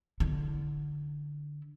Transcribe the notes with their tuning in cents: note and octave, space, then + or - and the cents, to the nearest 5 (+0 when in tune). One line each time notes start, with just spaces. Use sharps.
D3 +0 E4 -10